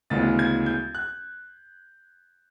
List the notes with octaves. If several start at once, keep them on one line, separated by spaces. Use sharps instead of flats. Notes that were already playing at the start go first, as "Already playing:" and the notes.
D2 C#3 E3 G#3 B3 A6
G#6
G6
F#6